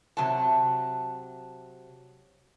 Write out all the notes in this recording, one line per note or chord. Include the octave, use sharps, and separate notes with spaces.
C3 F#3 A5